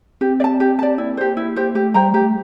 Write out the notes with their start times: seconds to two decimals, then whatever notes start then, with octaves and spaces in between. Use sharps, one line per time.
0.21 C4 G4
0.40 D5
0.44 A5
0.60 G4
0.79 D5 A5
0.98 A#3 E4
1.17 G4 C5
1.37 E4
1.56 G4 C5
1.75 A3 G4
1.94 G3 C5 G5 A#5
2.13 A3 G4